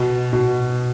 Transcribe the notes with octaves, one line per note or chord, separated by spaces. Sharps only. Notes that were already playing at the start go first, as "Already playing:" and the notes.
Already playing: B2
B2